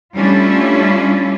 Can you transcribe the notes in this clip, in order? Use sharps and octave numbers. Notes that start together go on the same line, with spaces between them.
G3 A3 C#4 D4 E4 F4